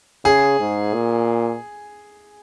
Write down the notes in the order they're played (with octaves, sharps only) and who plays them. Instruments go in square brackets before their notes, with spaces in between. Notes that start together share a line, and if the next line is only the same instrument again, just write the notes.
[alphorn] C#3 [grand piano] G#4
[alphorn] G#2
A#2